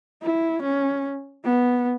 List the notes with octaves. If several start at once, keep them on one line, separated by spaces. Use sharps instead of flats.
E4
C#4
B3